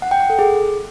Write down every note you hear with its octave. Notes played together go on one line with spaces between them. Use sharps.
F#5
G5
F#5
A4
G#4